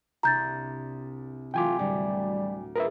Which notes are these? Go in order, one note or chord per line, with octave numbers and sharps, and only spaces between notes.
C2 D4 A#5 G6 A6
E3 F#3 A3 F4 G5 G#5 D6
D2 A2 G3
F4 G#4 A#4 B4 D#5 E5